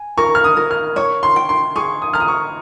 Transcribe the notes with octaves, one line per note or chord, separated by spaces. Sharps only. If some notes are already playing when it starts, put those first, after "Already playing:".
Already playing: G#5
A#4 C#6
F6
D#6
A#4
F6
C#5 C#6
C6
G5
C6
G#4 C#6
D#6
A#5 F6
D#6
C#6